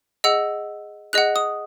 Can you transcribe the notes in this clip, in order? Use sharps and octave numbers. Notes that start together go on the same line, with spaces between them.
G#4 D#5 F#5 E6
G#4 D#5 F#5 F#6
D#6